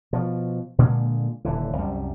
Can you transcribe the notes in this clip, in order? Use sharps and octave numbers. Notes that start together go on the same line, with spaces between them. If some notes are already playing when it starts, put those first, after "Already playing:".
B2 F3
A#2 D3 G#3 A#3
D#1 D3 E3
C2 F#2 G3